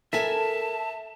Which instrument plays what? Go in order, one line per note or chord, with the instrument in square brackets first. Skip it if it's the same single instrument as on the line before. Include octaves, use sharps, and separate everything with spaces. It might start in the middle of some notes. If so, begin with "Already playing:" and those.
[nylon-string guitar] A4 A#4 G#5 [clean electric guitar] E5 [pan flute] A5